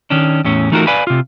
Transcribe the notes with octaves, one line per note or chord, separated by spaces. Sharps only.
D#3 C#4 D4
E2 A2 C#4
E3 A3 D#4 F4 F#4 A#4
B4 D5 F5 G#5 B5
C3 F4